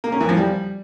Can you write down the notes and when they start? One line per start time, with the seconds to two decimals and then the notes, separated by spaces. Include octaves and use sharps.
0.04 A#3
0.12 C#4
0.20 E3
0.29 F3
0.37 G3